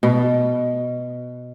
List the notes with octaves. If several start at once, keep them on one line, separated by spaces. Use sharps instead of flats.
B2